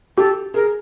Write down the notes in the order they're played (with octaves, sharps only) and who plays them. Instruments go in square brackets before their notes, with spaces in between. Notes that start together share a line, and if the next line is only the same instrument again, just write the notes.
[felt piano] G4 [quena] A4
[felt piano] G#4 [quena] A#4